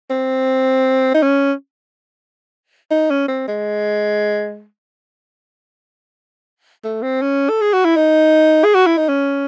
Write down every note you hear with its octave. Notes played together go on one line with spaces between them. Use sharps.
C4
D#4
C#4
D#4
C#4
C4
G#3
A3
C4
C#4
A4
G#4
F#4
E4
D#4
G#4
F#4
E4
D#4
C#4